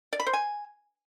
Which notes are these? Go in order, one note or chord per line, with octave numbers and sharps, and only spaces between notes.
D5
B5
C5
G#5